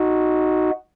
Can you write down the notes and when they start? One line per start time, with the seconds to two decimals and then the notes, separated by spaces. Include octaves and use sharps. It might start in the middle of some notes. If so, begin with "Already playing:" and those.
Already playing: D#4 F#4